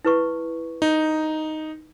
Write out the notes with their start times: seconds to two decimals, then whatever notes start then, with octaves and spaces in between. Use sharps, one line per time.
0.05 E4 B4 C#6
0.82 D#4